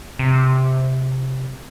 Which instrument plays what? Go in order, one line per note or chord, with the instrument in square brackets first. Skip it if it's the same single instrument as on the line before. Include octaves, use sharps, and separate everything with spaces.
[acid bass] C3